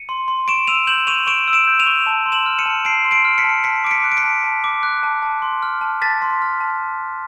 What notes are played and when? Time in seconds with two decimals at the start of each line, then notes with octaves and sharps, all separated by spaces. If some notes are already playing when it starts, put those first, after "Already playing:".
Already playing: C#7 D#7
0.09 C6
0.28 C6
0.48 C#6 D7 E7
0.67 E6 D#7 F7
0.87 G6 E7 F#7
1.07 C#6 D#7 F7
1.27 C#6 D7 E7
1.48 E6
1.53 D7 E7
1.67 G6
1.79 D#7 F7
1.86 C#6
2.06 A5
2.26 C6
2.32 E7 F#7
2.46 F6
2.59 C#7 D#7
2.66 A5
2.85 A5 C7 D7
3.05 C6
3.11 C7 D7
3.25 F6
3.38 B6 C#7
3.44 A5
3.64 A5 B6 C#7
3.84 D6 D7
3.91 B6 C#7
4.04 F#6
4.12 D7
4.17 B6 C#7
4.24 A5
4.44 A5
4.64 D6
4.83 F#6
5.03 A5
5.22 A5
5.42 C6
5.62 F6
5.81 A5
6.02 A5 A6 B6
6.22 C6
6.42 F6
6.61 A5